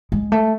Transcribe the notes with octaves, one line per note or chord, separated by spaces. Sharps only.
G#3
A3